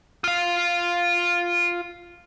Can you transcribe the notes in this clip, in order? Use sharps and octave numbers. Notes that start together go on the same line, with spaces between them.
F4 F5